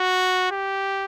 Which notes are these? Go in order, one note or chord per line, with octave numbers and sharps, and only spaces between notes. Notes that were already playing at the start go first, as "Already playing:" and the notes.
Already playing: F#4
G4